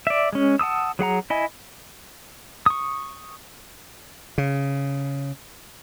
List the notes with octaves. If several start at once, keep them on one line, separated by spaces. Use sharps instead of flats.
D5 E5
G#3 C#4
F#5 A5 D#6 E6
F#3 G#4 F#5 A#5
E4 D#5 G#5
C#6 D#6
C#3